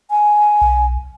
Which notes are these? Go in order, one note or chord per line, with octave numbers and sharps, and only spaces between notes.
G#5
B1